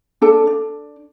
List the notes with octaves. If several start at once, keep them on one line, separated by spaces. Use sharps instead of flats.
D4 A4 A5
D4